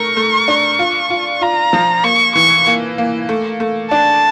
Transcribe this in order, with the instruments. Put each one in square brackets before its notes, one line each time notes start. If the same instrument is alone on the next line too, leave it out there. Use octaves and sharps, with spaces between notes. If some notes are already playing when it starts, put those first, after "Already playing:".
Already playing: [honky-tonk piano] A3 A#4 [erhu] C#6
[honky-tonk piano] A3
D4
F4
F4
[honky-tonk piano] F4 [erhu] A#5
[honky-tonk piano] F3
[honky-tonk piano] A#3 [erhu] C#6
[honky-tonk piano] E3 [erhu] C#6
[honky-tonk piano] A#3
A#3
A3
A3
[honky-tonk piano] D4 [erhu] A5